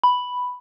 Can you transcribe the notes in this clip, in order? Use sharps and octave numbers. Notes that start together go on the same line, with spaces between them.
B5